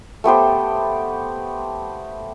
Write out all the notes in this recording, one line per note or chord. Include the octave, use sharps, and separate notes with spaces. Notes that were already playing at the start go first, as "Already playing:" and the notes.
A3 B3 G4 C5